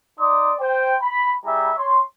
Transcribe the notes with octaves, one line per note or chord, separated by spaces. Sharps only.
D#4 D5 C6 D6 D#6
C5 G5
B5
G3 E4 G#4 E5 A#5
C#5 C6